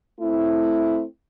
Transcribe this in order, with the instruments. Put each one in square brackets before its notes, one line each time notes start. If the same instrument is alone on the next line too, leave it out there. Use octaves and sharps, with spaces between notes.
[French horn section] A3 C4 E4